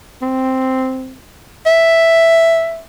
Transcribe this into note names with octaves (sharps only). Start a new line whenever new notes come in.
C4
E5